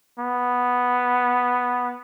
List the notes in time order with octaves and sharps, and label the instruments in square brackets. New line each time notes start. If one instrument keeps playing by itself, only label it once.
[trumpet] B3